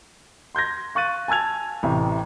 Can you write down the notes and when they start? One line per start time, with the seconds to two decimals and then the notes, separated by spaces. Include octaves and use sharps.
0.55 C6 G6 G#6 A#6
0.95 F5 C#6 F#6 A6 D#7
1.28 G#5 A5 E6 G#6 F7
1.83 A1 A2 C3